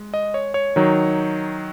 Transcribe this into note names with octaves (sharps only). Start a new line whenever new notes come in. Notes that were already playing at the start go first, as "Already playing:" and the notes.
Already playing: G#3
D#5
C#5
C#5
D#3 F#3 D#4